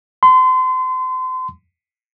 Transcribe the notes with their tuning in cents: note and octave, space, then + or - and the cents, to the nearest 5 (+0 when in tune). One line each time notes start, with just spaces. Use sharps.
C6 -35